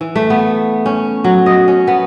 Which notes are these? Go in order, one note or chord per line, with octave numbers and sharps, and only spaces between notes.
E3
A3
B3
C#4
F#3
D#5
C#4
B3